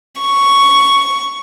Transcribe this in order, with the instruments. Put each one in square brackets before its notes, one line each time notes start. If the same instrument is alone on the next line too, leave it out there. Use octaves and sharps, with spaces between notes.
[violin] C#6